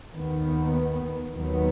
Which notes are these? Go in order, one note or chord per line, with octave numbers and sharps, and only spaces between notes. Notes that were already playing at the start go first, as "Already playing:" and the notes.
D#2 D#3 B3
D#2 D#3 F#3 B3